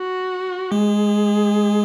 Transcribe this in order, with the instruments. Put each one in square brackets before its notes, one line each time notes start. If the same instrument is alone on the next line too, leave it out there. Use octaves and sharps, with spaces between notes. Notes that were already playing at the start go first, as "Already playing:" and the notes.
Already playing: [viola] F#4
[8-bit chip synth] G#3 [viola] G#4